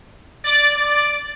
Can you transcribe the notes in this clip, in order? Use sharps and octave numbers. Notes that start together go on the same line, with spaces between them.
D5
D5